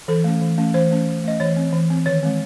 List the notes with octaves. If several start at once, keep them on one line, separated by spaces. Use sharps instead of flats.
E3 A4
A3 C#4
E3
A3 C#4
E3 C5
A3 C#4
E3
A3 C#4 D#5
E3 C#5
C4
E3
C4
D#3 C#5
G#3 C4